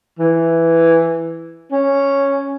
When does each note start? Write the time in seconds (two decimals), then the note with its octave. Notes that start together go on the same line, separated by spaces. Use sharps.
0.19 E3
1.72 C#4